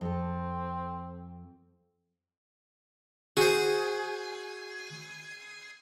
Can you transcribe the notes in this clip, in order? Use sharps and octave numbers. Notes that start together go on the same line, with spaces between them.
F2 C4 A4
F#4 G#4 C5